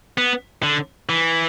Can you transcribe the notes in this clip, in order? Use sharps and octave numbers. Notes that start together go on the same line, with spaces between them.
B3
D3
E3